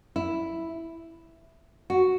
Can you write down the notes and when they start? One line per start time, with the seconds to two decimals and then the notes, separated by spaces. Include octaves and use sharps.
0.16 E4
1.90 F#4